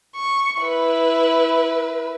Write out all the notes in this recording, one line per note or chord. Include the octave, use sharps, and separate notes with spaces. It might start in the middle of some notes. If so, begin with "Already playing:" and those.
C#6
E4 B4